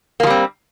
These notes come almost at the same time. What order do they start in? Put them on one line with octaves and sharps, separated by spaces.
A#3 F3 G3 C4